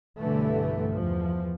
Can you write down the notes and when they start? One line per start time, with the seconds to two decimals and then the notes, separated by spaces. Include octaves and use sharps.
0.18 B1 G2 D3 E3 A3
0.93 E2 F3